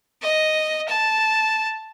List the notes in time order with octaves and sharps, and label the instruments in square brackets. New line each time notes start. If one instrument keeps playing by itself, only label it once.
[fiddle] D#5
A5